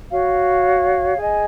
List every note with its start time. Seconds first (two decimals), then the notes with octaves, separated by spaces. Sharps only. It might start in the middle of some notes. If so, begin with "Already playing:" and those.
0.10 F#4 C#5 F5
1.17 G#4 D#5 G#5